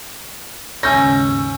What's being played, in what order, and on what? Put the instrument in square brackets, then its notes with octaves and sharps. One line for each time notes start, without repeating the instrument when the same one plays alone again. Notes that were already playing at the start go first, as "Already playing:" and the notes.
[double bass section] D#2 G#2 C#3 [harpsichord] C#4 [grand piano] G#5 G6 A#6 [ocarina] E6